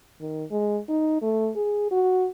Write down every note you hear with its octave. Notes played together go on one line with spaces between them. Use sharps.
D#3
G#3
D#4
A3
G#4
F#4